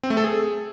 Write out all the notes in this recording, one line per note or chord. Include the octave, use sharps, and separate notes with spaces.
C4
A3
A4
G#4